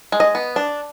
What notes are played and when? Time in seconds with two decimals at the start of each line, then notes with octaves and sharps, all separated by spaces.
0.12 G#3
0.20 D#5
0.35 B3
0.56 D4